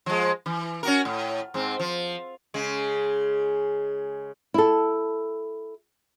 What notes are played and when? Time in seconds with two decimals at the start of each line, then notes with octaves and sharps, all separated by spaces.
0.06 F3 G#3
0.46 E3
0.83 C#4 F#4 A#4
1.05 A2
1.54 G#2 C4
1.79 F3
2.54 C#3 G#3
4.54 E4 A4